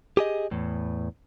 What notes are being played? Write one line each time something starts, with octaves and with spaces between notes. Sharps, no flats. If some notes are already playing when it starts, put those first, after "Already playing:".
G4 G#4 D#5
E2 A2